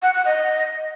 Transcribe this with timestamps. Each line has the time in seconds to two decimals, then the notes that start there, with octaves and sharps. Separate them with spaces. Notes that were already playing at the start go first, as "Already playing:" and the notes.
0.02 F#5
0.14 F#5
0.25 D#5